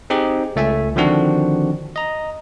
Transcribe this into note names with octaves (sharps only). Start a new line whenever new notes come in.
C4 D#4 G4 G#4
C#2 A3 E5 G#5
D3 D#3 F3 C4 D4 F#4
D#5 A#5